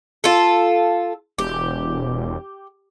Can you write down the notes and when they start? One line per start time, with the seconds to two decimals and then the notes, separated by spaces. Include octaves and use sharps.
0.24 F4 A4
1.38 E1 G4